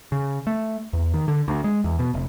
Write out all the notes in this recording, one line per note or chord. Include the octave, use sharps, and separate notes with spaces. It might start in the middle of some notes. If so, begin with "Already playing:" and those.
C#3
A3
E2
D#3
D3
D2
G#3
E2
B2
F1